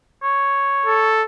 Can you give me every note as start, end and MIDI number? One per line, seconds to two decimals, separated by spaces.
0.23 1.23 73
0.86 1.25 69